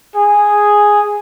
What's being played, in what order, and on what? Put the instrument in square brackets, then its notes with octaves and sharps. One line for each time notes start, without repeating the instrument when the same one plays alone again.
[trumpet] G#4